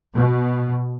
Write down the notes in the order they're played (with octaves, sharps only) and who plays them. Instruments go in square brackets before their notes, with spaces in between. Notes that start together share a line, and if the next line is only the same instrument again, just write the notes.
[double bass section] B2